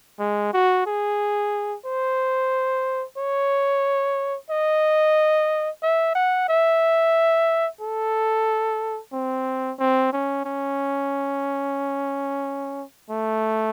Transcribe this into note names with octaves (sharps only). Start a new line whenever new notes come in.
G#3
F#4
G#4
C5
C#5
D#5
E5
F#5
E5
A4
C4
C4
C#4
C#4
A3